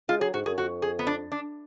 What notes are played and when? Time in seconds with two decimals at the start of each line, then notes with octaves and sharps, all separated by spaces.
0.09 G#3 F4
0.21 F#3 G#4
0.34 G#2 F#4
0.46 F#2 G#4
0.58 F2 F#4
0.82 G#4
0.99 B3
1.07 D4
1.32 D4